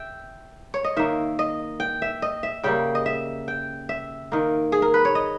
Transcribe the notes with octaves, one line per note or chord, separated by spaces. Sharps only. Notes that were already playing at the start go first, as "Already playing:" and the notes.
Already playing: E5 G5
C#5
D#5
D#3 A#3 E5
D#5
G5
E5
D#5
E5
C#3 G3 A#3 G5
D#5
E5
G5
E5
D#3 A#3
G#4
A#4
B4
C#5
D#5